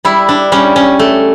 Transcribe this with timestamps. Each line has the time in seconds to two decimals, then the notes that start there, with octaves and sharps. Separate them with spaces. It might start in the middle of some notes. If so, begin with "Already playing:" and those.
0.05 G3 E4
0.29 D4
0.52 G3 C#4
0.76 C#4
0.99 A3